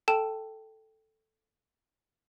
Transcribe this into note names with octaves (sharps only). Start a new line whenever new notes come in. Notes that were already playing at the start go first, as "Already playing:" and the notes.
A4 G5 A5 E7